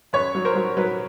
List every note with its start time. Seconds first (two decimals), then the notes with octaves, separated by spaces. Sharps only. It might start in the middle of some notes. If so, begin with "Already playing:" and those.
0.13 F#2 B4 C#5
0.35 F#3
0.45 A#4 C5
0.56 F#3
0.77 F#3 B4